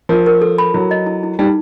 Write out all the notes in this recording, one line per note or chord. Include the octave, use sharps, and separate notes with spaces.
F3 A#4
A#4
A4
B5
F#3 E4
D#5
E4
E4
G3 D#4